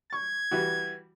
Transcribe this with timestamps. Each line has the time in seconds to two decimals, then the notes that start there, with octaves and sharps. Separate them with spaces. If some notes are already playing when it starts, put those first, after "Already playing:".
0.13 C#6 G#6
0.51 E3 G3 F#4